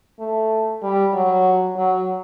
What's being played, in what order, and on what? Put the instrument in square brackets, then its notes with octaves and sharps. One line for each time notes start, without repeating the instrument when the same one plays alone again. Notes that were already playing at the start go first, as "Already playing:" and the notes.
[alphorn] A3
G3
F#3
F#3